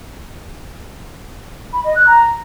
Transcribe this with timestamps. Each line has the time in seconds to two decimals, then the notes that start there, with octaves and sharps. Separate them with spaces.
1.73 B5
1.84 D#5
1.96 F#6
2.07 A#5